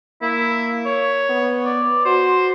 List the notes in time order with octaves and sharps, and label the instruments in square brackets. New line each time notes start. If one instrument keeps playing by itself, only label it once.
[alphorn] A#3 [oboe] E4
[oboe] C#5
[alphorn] B3
[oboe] D5
[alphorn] F#4 [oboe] C5